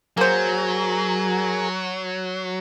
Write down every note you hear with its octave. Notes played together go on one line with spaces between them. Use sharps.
F#3 A#3 G#4 A#4 C5